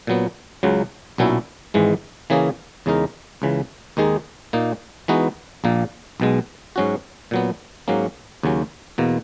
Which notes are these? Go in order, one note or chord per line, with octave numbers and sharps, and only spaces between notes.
A#2 F#3 B3
C#2 C#3 F#3
B1 A#2 F#3 C#4 E4
G#1 G#2 E3 G#3
C#3 E3 A#3 C#4 G#4
E2 C#3 G#3 D#4 A#4
C#2 C#3 E3
D#2 D#3 G#3 D#4 G#4
A#2 A#3 D#4
E3 G#3 B3 D#4 F#4
A#1 A#2 A#3
B1 B2 G#3
G#2 F#3 C#4 F#4
A#2 F#3 B3
G#2 F#3 A#3 C#4
D#2 C#3 F#3 C#4
E2 B2 A#3